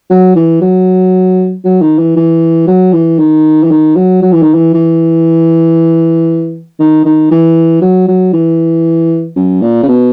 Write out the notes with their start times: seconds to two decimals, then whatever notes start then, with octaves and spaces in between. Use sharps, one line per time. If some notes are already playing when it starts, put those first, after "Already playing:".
0.10 F#3
0.35 E3
0.61 F#3
1.64 F#3
1.81 D#3
1.98 E3
2.16 E3
2.67 F#3
2.93 E3
3.19 D#3
3.63 E3
3.71 D#3
3.96 F#3
4.22 F#3
4.33 E3
4.42 D#3
4.54 E3
4.74 E3
6.79 D#3
7.05 D#3
7.31 E3
7.81 F#3
8.08 F#3
8.33 E3
9.36 F#2
9.62 A#2
9.83 C#3
9.88 B2